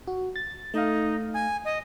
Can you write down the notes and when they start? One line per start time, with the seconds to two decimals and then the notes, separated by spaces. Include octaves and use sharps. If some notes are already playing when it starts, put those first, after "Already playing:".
0.07 F#4
0.36 A6
0.74 A3 D#4 F5
1.34 G#5
1.65 D#5